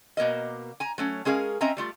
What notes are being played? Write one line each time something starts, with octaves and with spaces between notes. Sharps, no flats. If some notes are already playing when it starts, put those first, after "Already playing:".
B2 A#3 A#4 D#5
G#5 A#5
F#3 A3 C#4
G#3 C#4 G#4 A#4 F5
C4 C#4 D#5 E5 A#5
G3 A3 F4